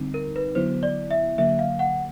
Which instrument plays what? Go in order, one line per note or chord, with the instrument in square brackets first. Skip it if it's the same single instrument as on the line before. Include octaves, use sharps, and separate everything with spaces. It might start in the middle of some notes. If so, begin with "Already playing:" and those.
Already playing: [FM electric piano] D3 G3 C4 D#4
[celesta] A#4
B4
[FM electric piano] D3 F#3 B3 E4 [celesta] C5
[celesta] D5
E5
[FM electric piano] D3 F#3 A#3 [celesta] E5
[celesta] F5
F#5